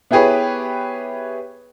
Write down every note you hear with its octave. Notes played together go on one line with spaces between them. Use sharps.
B3 E4 G4 G#4 B4 C#5